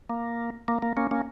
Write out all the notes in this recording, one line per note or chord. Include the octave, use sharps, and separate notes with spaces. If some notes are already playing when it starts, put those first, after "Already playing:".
A#3
A#3
A#3
A#3 C#4
A#3 C#4